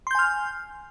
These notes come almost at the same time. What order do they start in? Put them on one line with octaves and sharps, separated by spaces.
C6 G6 G#5 F6